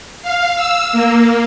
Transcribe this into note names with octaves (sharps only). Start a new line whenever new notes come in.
F5
E6
A#3